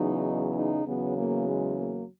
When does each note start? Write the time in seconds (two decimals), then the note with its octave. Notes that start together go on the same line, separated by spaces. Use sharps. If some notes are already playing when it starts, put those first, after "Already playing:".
Already playing: E2 C#3 F#3 D#4
0.56 D#4
0.86 E2 C#3 F#3 B3
1.17 A#3
1.46 G#3
1.77 A#3